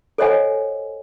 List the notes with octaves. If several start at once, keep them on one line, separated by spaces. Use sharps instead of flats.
A4 C5 C#5 D#5 F#5 G#5